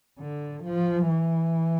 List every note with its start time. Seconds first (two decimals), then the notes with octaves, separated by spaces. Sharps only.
0.19 D3
0.64 F3
1.08 E3